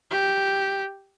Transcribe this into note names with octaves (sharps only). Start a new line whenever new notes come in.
G4